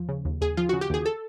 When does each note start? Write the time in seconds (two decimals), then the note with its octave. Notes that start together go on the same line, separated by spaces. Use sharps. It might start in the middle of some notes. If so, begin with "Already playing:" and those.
Already playing: D#2 F3
0.09 C#3
0.25 D#2
0.41 D#2 G#4
0.57 F3 F4
0.69 C#3 F#4
0.81 G4
0.90 D#2 G#4
1.06 A4